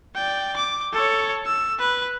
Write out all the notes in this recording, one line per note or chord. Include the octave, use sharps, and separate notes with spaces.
D5 G5
D6
A4 C#5
E6
B4